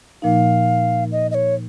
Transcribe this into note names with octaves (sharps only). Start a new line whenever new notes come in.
A#2 F3 A#3 D#4 F5
D#5
D#5
C#5